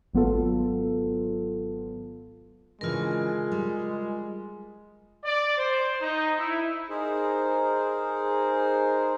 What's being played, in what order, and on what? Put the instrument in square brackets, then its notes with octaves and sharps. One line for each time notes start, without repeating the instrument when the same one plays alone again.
[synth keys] G#1 F#3 B3 F4 A4
[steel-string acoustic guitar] C#3 E3 D4 [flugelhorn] G#3 [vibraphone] F4 A#4
[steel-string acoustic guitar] G3
[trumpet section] D5
C5
D#4
E4
[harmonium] D#4 G#4 A#4 C5